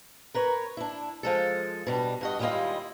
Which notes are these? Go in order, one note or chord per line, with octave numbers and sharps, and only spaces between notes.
A#4 B4 C#5
D4 E4
F3 G#3 A4
B2 G3 D4
G2 F#4 D#5
D#2 G3 G#3 E4 F4 D#5